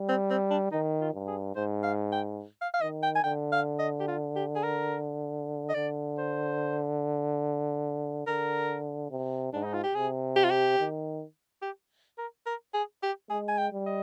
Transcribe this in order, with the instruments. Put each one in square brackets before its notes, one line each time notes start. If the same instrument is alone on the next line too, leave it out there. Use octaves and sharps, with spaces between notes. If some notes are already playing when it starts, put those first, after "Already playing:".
Already playing: [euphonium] G3
[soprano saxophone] C4
C4
D4
[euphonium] D#3 [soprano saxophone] D#4
[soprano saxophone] F4
[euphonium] G2
[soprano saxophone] G#4
[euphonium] G#2 [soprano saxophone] C5
[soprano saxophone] F5
G5
F5
F5
[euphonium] D#3 [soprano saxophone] D#5
[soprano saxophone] G5
G#5
[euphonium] D3 [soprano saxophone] G5
[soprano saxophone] F5
D#5
G4
F4
G4
G#4
A#4
D#5
[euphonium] D3 [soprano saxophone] D5
[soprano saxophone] C5
[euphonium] D3 [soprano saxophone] A#4
[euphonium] C3
[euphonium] G#2 [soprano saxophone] D4
[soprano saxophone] D#4
F4
G4
[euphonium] C3 [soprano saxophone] G#4
[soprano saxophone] G4
F4
G4
[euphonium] D#3
[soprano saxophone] G4
A#4
A#4
G#4
G4
[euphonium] G#3 [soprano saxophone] G#4
[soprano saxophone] G#5
G5
[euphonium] G3
[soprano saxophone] D#5